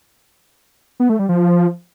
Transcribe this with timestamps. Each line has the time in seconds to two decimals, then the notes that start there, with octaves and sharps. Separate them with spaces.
1.00 B3
1.09 A3
1.19 G3
1.29 F3